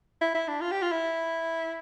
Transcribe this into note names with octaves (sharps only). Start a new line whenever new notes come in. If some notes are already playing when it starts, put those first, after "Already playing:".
E4
E4
D4
F4
G4
F4
E4